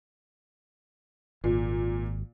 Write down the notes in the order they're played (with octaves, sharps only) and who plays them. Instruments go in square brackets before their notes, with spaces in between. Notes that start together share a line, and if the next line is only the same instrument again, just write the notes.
[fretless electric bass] G#1 [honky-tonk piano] A#2